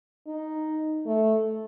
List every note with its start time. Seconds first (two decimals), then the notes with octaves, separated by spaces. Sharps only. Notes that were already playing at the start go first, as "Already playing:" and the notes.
0.27 D#4
1.06 A3